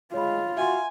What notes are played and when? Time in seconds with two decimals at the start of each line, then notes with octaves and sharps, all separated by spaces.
0.14 G#3 F4 C#5 B5
0.57 F#4 E5 F#5 G#5 C6